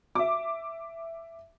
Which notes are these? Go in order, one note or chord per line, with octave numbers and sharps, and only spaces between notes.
E5 D6